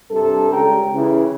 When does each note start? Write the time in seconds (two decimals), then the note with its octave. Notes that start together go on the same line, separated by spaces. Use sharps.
0.11 G2 C3 A4
0.52 C#2 G2 G4 G5 A#5
0.94 C#3 E3